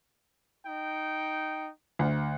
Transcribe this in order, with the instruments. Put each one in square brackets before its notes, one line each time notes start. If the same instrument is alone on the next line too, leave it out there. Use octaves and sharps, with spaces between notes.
[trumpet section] D#4 G5
[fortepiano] D2